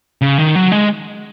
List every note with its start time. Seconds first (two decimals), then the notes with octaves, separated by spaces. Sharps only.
0.22 C#3
0.38 D#3
0.55 F#3
0.72 G#3